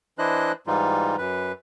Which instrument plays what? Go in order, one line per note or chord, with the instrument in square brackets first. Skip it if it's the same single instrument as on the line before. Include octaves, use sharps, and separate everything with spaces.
[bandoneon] E3 D4 E4 C5 D#5 F#6
G#2 E3 G3 D#4 F4
F#2 B4